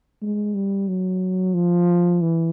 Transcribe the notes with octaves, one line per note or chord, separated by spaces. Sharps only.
G#3
G3
F#3
F3
E3